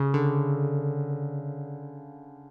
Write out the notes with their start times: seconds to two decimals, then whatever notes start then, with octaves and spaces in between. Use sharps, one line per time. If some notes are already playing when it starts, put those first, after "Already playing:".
Already playing: C#3
0.14 D3